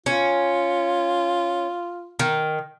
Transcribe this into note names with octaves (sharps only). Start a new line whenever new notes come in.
C#4 F4
D#3